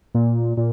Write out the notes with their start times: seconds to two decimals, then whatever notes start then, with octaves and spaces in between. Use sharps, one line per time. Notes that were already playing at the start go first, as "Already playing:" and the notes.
0.14 A#2
0.57 A#2